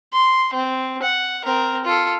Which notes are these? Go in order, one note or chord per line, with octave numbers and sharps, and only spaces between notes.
C6
C4
F#5
C4 A#4
F4 A4